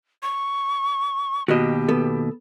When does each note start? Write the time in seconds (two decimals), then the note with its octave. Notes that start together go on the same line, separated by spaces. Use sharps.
0.22 C#6
1.48 D#2 B2 F#4 G4 D#5
1.88 B3 A4